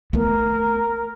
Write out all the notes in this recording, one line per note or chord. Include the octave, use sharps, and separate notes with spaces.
A3 B3 A#4